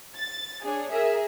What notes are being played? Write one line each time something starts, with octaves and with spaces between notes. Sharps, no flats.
A6
D4 G#4 C#5
G#4 A#4 E5